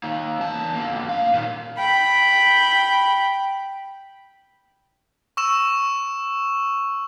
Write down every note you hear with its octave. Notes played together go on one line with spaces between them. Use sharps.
A#3 D#4
E2 A5
D3 A#3
F#2 F5
A#2 D#3
G5 B5
C#6 E6 E7